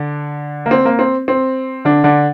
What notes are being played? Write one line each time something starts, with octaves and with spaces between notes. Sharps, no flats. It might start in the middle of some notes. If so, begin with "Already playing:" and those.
Already playing: D3 D4
A#3
C4
A#3
C4
C4
D3 D4
D3 D4